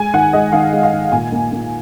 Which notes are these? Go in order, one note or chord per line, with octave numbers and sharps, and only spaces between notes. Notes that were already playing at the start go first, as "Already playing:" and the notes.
Already playing: G#3 G#5
D#3 F#5
G#3 D#5
D#3 F5
G#3
F5
D#3
A#2 G#5
A#3
A#3